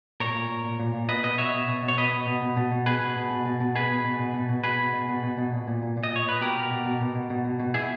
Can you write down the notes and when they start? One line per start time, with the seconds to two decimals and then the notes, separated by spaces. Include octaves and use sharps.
0.20 A#2 A#4 C#5
0.35 A#2
0.50 A#2
0.65 A#2
0.80 A#2
0.94 A#2
1.09 B2 B4 D#5
1.23 B2 B4 D#5
1.38 B2 C#5 E5
1.54 B2
1.68 B2
1.83 B2
1.88 C#5
1.98 B2 B4 D#5
2.13 B2
2.27 B2
2.42 B2
2.57 B2
2.72 B2
2.86 B2 G#4 B4
3.01 B2
3.16 B2
3.31 B2
3.46 B2
3.60 B2
3.75 B2 G#4 B4
3.90 B2
4.04 B2
4.19 B2
4.34 B2
4.49 B2
4.64 B2 G#4 B4
4.79 B2
4.93 B2
5.09 B2
5.23 B2
5.38 B2
5.53 A#2
5.68 A#2
5.82 A#2
5.97 A#2
6.03 D#5
6.12 A#2 C#5
6.27 A#2 B4
6.41 B2 G4 A#4
6.57 B2
6.71 B2
6.86 B2
7.01 B2
7.15 B2
7.30 B2
7.45 B2
7.60 B2
7.74 B2 E4 G#4